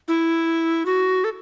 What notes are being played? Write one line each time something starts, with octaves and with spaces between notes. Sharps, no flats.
E4
F#4
A4